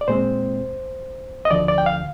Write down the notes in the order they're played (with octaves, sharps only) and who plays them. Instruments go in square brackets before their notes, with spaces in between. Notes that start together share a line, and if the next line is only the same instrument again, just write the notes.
[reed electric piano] D5
A#2 G#3 C4 C5
D#5
D2 D3 F3 D5
D5
G5
F5